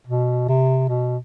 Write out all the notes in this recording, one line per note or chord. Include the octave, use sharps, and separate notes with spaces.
B2
C3
B2